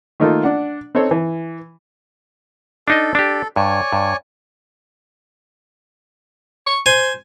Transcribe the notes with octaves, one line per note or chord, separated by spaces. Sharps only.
D#3 A3 A#3 D#4 F4 A4
D4 D5 F#5
C4 D#4 A4 C5 C#5
E3
D4 D#4 A4 D#5
D4 G4
G2 C#5 D5 G#5
G2
C#6
C5 G#5